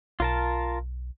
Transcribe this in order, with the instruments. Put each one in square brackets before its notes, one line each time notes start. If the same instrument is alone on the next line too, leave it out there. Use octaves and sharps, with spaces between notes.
[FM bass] B1 [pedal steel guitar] F4 A#4 A5